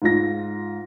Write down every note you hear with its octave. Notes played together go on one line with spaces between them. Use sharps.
G#2 F4 A#6